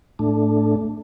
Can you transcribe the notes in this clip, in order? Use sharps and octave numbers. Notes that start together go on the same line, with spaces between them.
A2 A3 D4